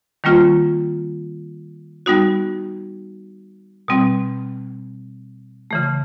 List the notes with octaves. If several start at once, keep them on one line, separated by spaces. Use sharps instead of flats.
D#3 G3 A#3 C#4 F4
G3 B3 D#4 F#4
B2 G3 C4
C#3 E3 A3